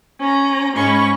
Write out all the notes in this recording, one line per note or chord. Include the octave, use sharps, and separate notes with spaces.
C#4 A#5
G#2 G#3 C#4 B5 C#6